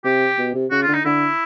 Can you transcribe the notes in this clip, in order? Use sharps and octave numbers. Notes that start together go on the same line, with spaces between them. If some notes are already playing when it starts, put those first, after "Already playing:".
C3 G4
B2
C3
C#3 F#4
F4
D3
D#4
D3 E4